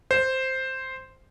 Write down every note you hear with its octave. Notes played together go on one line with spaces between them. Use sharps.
C5